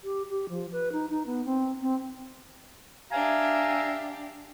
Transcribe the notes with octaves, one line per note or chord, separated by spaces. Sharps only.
G4
G4
F3
B4
D#4
D#4
B3
C4
C4
D4 G4 E5 F5 G#5 A#5